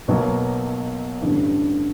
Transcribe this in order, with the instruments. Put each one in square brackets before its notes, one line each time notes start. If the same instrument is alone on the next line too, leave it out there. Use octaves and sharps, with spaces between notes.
[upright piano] B1 B2 F#3 A#3
A1 G2 D3 G3